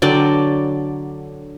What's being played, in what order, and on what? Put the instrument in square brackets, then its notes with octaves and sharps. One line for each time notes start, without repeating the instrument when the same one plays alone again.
[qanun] D3 F#3 D5 G5